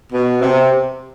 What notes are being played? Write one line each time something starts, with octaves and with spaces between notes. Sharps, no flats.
B2
C3